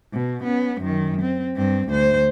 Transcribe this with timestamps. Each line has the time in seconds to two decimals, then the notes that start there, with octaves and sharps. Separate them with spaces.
0.13 B2
0.44 B3 C#4
0.81 F#2 D#3
1.21 C4
1.56 G2 C4
1.88 D2 C5